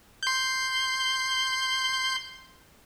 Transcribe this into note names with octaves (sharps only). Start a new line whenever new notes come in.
C6 G6